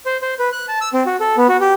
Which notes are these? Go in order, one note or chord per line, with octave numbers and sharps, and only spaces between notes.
C5
C5
B4
F#6
A5
E6
C4
F#4
A4
B3
F#4
G4